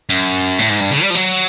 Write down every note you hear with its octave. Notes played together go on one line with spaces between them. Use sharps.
F#2
A2
G#2
G2
C#3
G3
F3
F#3